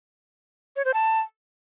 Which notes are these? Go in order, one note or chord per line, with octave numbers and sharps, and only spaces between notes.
C#5
C5
A5